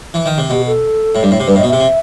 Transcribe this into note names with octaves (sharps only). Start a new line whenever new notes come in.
E3
D#3
C3
B2 G4
A4
A2
G2
A2
C3
G2 B4
A2
D#5
B2
C3 E5
C3